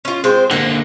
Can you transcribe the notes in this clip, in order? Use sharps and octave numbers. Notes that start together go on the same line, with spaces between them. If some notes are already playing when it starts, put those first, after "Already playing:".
C#4 F4
G#3 C4 C5
D3 A#3 F#5